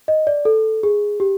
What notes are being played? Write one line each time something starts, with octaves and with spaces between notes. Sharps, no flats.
D#5
D5
A4
G#4
G4